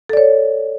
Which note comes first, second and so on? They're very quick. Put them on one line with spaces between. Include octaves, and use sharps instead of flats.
A4 D5 C#5